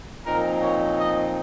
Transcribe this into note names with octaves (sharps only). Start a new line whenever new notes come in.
A#2 F3 C4 D#4 A#4
C#5
D#5